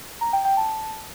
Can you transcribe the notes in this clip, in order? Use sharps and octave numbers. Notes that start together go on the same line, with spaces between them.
A#5
G5
G5
A5